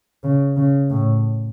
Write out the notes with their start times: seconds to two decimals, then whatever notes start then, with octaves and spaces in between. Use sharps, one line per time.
0.23 C#3
0.57 C#3
0.90 A2